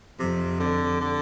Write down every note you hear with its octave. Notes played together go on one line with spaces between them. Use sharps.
F2 C3
D3
D3